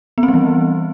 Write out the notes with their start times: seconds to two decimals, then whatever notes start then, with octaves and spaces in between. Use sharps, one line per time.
0.18 B3
0.23 C4
0.28 G3
0.34 E3